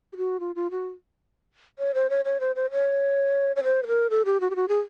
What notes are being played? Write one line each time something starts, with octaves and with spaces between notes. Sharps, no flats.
G4
F#4
F4
F4
F#4
C#5
C5
C#5
C#5
C5
C5
C#5
C#5
C5
B4
A#4
A4
G4
F#4
G4
F#4
G#4